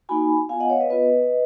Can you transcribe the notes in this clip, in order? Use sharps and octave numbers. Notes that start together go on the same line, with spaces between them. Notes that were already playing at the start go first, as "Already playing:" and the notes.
A#3 D#4 F#4 G#5 B5
B3 F4 F5 G#5
D#5 F#5
C#5 F5
B4 D#5
B3 F4 B4 D#5